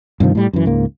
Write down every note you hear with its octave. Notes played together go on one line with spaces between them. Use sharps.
G2 C3 D#3 F3
A2 G3
F#2 E3
C#2 G#2 A#3